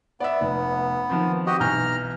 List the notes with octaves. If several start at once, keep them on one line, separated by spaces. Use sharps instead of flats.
B3 D5 E5
F1
D#3 F3 C4
F#4 G4 D#5
B1 E3 A#5 F6 G6